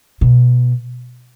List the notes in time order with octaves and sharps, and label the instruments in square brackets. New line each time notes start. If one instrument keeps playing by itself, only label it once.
[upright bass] B2